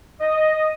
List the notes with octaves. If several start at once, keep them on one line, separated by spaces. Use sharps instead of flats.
D#5